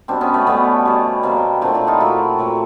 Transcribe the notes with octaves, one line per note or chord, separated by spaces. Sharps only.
B2 G3 C4 D4
B3 C#4
A3 B3
B2 G3 A3 B3
B2 G3
B2 G3 A#3 C4
A#2 F#3 A3 C4 D4
D4 E4
D#4 F4
A#2 F#3 A3 E4 F#4
A#2 F#3 A3